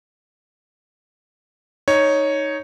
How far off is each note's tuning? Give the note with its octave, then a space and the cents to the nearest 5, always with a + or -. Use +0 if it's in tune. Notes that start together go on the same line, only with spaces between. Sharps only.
D#4 +0 C#5 +0